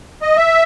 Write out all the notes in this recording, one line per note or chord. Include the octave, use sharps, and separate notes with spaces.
D#5
E5